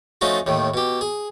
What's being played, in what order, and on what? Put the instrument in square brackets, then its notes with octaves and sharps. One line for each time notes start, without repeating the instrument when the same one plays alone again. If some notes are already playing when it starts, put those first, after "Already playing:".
[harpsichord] F3 A3 C#4 D#4 F4 F#4
D#2 A2 D#3
B2 G4
G#4